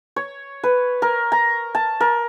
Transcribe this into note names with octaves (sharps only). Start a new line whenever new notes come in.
C#5
B4
A#4
A#5
A5
A#4